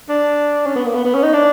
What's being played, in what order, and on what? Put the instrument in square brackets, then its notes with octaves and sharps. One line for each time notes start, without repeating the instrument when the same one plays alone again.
[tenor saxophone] D4
C#4
B3
A#3
B3
B3
C#4
D#4
D4